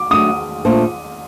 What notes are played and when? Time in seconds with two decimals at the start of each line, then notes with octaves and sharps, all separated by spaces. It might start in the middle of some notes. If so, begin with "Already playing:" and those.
Already playing: D6
0.11 F#3 A3 D4 D#6
0.65 A#2 A3 D4 A4 C5